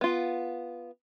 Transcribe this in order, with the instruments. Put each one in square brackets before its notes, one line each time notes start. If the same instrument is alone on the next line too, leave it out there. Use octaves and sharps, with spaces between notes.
[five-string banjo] B3 F4